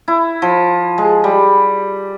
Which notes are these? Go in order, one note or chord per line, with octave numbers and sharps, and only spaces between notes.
E4
F3
G#3
G3